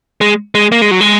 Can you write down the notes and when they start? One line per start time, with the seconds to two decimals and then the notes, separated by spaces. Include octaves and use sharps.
0.21 G#3
0.55 G#3
0.72 A#3
0.82 G#3
0.91 F#3
1.01 G#3